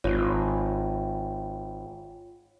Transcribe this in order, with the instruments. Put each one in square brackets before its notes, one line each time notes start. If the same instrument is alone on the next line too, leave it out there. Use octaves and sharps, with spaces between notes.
[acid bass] G#1 [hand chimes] F4 C#5